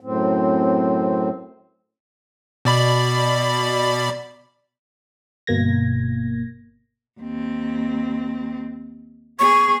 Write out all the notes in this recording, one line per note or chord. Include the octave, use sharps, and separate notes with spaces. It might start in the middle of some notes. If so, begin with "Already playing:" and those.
F#2 A2 C4
B2 D5 B5
G1 B2 A#3 G#6 A#6
D#2 C4
B3 G#4 C#6